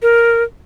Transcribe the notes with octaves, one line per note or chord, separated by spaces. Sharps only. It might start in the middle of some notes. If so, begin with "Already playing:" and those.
A#4